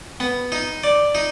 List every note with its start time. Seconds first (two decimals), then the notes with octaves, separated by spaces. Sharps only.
0.20 B3
0.52 D#4
0.84 D5
1.15 D#4